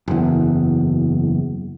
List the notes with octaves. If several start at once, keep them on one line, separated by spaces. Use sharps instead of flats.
F#1 E2